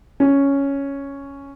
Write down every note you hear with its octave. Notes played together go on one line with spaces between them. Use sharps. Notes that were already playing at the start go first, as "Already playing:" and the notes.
C#4